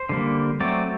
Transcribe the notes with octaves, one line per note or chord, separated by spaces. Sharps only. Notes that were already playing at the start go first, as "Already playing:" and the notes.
Already playing: C5
D3 G3 A#3
F#3 A3 C4 D5